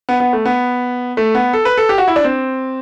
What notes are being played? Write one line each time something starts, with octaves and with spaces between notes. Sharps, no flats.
B3
B3
A3
B3
A3
B3
A4
B4
A4
G4
F#4
E4
D4
C4